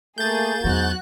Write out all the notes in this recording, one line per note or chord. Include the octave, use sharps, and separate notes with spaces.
A3 A#3 G#4 G6 A6
E2 G#2 F#3 F#4 F#6